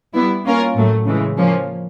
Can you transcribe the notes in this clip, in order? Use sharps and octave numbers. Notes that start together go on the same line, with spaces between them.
G3 B3 E4
A#3 C#4 F4 A#4
A2 F#3 A3
C#3 E3 G#3
F3 A#3 C#4